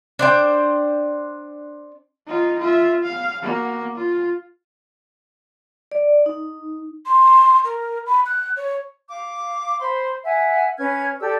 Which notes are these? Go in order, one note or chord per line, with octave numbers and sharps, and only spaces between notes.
D4 C5 G5
D#4 F4
F4 E5
F5
A#3 F#4
F4
D5
D#4
C6
A#4
B5
F#6
C#5
F5 D6
C5 B5 C6
E5 F#5 G#5
C#4 B4 F6 G#6
G4 A4 D5 E6